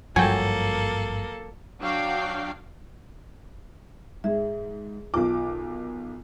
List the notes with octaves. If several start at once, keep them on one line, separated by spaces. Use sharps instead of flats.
G#1 G2 F3 F#3 A#3 A4 G5 G#5
F#3 D4 F#4 F5 G5
G#2 G#4 E5
B1 D#3 F4 D6